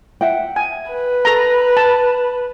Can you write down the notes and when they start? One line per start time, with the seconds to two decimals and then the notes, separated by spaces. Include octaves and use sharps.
0.21 E5 F#5 G5
0.56 G#5
0.91 B4
1.25 A4 A#5
1.77 A5